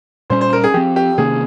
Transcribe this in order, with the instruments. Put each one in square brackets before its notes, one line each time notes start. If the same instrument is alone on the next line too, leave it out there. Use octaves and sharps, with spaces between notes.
[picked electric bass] A#2 G3 C#4 [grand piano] C5
[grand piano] C5
A#4
G#4
[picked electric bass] F3 C4 [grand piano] G4
[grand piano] G4
[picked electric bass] C3 D#3 A#3 C#4 [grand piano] G#4